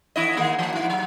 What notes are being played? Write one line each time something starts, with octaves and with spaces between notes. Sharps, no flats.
E2 E4 D#5
D#3 G#3 A#3
F3 A#3
G#2 E4
F#3